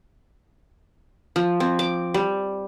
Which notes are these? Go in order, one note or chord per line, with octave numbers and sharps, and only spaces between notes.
F3
C4
D6
G3